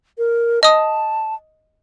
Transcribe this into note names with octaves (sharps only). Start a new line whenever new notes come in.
A#4
D#5 A5 D#6